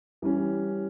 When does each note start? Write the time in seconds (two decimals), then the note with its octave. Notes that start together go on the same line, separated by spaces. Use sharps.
0.22 E3 G3 C#4